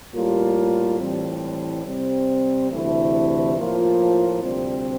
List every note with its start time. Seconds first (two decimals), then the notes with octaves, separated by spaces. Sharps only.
0.14 A2 G3 A#3 F4
1.00 A2 E3 G3 C4
1.85 C3 G3 C4
2.71 D2 C3 E3 A3 E4
3.57 A2 F3 A#3 F4
4.43 D2 C3 G3 C4